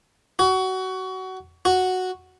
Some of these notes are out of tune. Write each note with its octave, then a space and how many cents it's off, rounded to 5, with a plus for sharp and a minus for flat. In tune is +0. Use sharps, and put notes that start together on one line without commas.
F#4 +20
F#4 -5